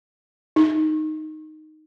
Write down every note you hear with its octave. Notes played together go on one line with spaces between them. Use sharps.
D#4